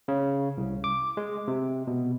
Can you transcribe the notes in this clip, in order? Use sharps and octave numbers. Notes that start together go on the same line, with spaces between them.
C#3
C2
D6
G#3
C3
B2